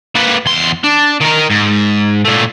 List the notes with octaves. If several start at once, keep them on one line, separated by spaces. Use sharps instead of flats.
A#3 B4
E2 C6
D4
D#3 A#4
G#2
A#2 A3